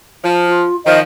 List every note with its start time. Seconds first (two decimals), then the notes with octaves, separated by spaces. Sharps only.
0.24 F3
0.47 F4
0.85 D#3 F3 D#5